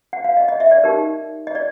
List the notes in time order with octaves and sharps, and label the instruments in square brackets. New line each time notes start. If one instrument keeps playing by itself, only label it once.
[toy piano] F#5
F5
D#5
D#5
E5
D5
D#4 G4 A#4
D#5
D5